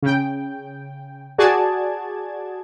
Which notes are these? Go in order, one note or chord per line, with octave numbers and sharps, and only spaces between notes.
C#3 G5
F#4 G#4 D5 A5 G#6